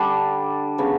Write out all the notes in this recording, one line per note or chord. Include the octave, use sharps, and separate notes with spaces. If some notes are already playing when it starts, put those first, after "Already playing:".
Already playing: D3 G3 D4 A4
C#3 F#3 B3